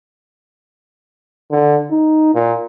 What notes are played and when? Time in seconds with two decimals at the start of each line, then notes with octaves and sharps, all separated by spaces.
1.51 D3
1.90 D#4
2.35 A#2